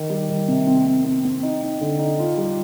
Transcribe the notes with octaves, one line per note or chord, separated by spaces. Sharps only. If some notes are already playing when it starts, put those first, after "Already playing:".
Already playing: D#3
G3
D#3
C3
C4
C4
C4
C4
D#4
D#4
D3
D#4
F4
G3